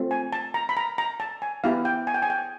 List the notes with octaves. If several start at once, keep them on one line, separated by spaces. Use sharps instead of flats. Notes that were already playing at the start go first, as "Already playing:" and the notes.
Already playing: A3 C4 F4
G#5
A5
A#5
B5
A#5
A#5
A5
G#5
B3 E4 G4 F5
G5
G#5
G5
G#5
G5